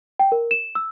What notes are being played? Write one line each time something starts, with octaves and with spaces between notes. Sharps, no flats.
G5
A#4
E7
E6